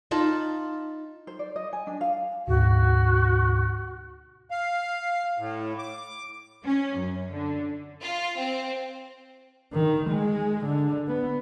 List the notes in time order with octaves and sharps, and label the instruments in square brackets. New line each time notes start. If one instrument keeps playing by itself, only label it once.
[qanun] D#4 F4 A5 B5
[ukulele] C5
D5
D#5
G#5
D4
F5
[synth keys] D2 G#2 B2 [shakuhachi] F#4
[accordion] F5
A2
D6
[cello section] C#4
F#2
D3
[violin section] F4
C4
[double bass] D#3
G#3
D3
B3